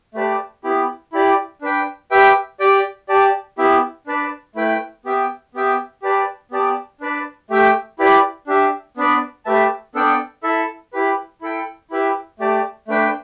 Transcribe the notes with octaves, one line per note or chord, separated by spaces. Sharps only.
A3 G4 B4 D5 A5
B3 E4 G4
E4 G4 D5
D4 B4 G5
G4 B4 E5 G5
G4 D5 G5
G4 D5 A5
B3 E4 G4 E5
D4 B4 D5 A5
A3 E4 B4 G5
B3 G4 E5 G5
B3 G4 E5 G5
G4 B4 D5 A5
B3 G4 D5 A5
D4 B4 D5 A5
A3 G4 E5 G5
E4 G4 B4 D5
D4 G4 E5
B3 D4 B4 D5
A3 G4 B4 E5 A5
B3 D4 A4 D5 G5
E4 A4 E5 A5
E4 G4 B4
E4 A4 G5
E4 G4 B4 E5
A3 G4 D5 A5
A3 D4 B4 G5